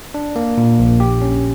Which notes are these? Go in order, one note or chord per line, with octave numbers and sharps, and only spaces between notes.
D4
A#3
A#2
A#1
G4
C#4